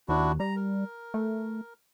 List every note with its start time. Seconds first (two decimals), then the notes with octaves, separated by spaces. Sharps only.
0.08 D#2 D4 E4 F#4
0.40 G3 A#5
0.57 A#4
1.14 A3